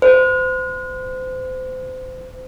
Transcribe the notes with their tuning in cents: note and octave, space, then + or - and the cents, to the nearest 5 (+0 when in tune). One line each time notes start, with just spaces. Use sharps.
C5 -30